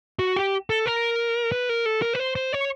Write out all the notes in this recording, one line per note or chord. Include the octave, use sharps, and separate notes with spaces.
F#4
G4
A4
A#4
B4
A#4
A4
A#4
B4
C5
C5
C#5